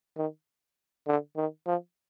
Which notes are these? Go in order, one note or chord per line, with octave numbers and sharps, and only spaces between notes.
D#3
D3
D#3
F3